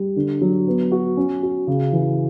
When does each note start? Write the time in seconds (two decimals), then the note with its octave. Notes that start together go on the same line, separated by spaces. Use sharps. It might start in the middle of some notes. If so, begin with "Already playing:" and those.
Already playing: G3
0.16 D3
0.41 F#3
0.67 B3
0.92 F#4
1.17 C#4
1.42 F#4
1.67 C#3
1.92 E3